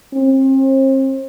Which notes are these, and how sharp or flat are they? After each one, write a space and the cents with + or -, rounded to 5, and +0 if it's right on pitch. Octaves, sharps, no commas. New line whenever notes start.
C4 +35